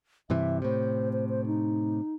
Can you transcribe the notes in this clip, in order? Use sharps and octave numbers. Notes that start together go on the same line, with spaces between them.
G2 C3 E3 E5
A2 C3 C5
C5
C5
D#4